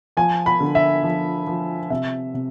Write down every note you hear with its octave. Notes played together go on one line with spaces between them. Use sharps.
F3 G#5
B5
D3
E5
F3
F3
C3 E5
C3